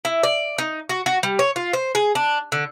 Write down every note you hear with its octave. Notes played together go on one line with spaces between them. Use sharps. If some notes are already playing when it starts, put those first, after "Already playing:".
E4
D5
D#4
F#4
F#4
G3
C#5
F4
C5
G#4
D4
D3